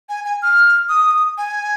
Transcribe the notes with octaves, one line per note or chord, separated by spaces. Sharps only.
G#5
G#5
F6
D#6
G#5